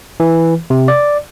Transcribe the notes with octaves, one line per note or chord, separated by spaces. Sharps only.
E3
C3
D5